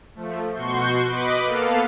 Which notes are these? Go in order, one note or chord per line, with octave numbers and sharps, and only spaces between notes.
F3 A3
B2 F#4 C6 C#6 G6
B4 D#5 B5 D6
A#3 B3 A4 F5